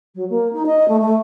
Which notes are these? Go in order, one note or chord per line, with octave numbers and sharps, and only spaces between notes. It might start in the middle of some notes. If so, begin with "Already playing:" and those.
F#3
A#3
D#4
D#5
A3
A3